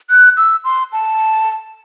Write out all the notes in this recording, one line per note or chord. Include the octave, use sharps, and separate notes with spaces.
F#6
E6
C6
A5